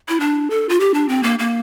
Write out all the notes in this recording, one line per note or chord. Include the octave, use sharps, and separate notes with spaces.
E4
D4
A4
F4
G4
D4
C4
A#3
A#3